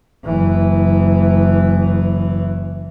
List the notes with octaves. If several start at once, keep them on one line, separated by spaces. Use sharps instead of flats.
F#1 E3